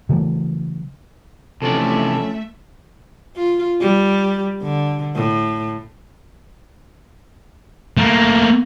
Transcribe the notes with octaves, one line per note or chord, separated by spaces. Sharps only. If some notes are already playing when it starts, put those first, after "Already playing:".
C#3 E3 F#3 A3
C3 E3 F3 A3 C#4 A4 D5 E5
F4
G3
D3
A2
A3 A#3